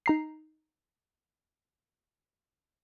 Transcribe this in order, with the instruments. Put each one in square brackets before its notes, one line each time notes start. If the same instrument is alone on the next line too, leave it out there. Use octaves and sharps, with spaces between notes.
[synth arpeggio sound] D#4 A#5 C7